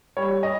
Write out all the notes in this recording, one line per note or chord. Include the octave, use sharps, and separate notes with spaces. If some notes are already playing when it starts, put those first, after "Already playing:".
G3 C#5
D#5